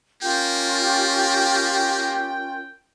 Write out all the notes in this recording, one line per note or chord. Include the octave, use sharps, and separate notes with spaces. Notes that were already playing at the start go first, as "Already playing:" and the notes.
A#3 C#4 F4 G4 A#4 G5